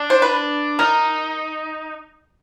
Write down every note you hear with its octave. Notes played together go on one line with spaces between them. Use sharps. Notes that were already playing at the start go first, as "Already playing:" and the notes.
Already playing: D4
C5
B4
D#4 A#4